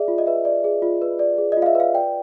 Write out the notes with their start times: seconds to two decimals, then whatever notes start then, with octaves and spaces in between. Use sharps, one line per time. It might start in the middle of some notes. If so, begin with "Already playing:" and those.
Already playing: G#4 D5 E5
0.08 F4
0.18 D#5
0.26 B4 E5
0.45 D5
0.64 G#4
0.82 F4
1.02 B4
1.19 D5
1.38 G#4
1.52 F4 D#5
1.62 F5
1.66 E5
1.75 B4 F5
1.94 D5 G5